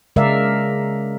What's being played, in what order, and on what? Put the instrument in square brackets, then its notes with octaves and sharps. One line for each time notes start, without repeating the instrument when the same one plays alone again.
[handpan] C#3 G#3 A#4 D5 E5 F5